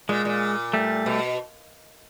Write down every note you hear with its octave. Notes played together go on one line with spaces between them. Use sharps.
A#2 G#3
A#2
G3 A3
B2